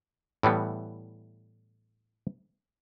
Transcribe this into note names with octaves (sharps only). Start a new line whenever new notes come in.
A2 E3 G3 B3